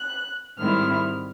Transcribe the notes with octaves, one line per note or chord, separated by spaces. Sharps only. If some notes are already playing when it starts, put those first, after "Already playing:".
Already playing: F#6
G#2 D#3 G3 C4 E4 F6